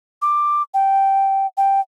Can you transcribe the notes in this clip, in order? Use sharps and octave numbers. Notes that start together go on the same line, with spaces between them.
D6
G5
G5